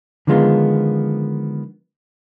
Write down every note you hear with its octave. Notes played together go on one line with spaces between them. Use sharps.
D3 D#3 F3 G#3 B3 F4